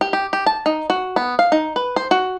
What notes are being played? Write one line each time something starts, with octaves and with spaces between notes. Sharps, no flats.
G4
G4
G4
A5
D#4
F#4
B3
F5
D#4
B4
C5
F#4